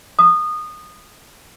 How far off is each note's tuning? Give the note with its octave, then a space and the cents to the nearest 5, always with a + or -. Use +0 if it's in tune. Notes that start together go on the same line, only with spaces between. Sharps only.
D#6 -20